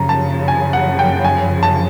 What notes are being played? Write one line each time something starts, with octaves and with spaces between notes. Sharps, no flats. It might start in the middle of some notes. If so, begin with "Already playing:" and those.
Already playing: F#2 C#3 F3 A#5
A5
G#5
F#5
G5
G#5
A5